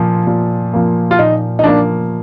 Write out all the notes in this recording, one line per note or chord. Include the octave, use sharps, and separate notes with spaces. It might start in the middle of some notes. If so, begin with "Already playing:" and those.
Already playing: A#2 F3 A#3
A#2
F3 A#3
F4
A#2 D#4
D#4
F3 A#3 D4